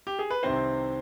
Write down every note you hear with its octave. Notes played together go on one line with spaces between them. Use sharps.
G4
G#4
B4
C2 C3 D#3 C4 C5